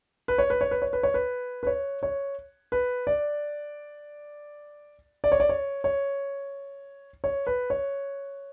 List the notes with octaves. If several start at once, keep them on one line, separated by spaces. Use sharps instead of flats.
B4
C#5
B4
C#5
B4
C#5
B4
C#5
B4
B4
C#5
C#5
B4
D5
D5
C#5
D5
C#5
C#5
C#5
B4
C#5